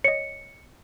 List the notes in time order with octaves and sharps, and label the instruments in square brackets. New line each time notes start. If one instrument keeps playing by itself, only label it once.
[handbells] C#5 D#5 [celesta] C#7